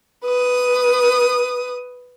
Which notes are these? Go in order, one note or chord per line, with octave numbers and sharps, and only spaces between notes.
B4 D#6